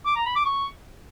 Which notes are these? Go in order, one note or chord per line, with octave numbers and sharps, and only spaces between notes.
D6
A#5
B5
D6
C#6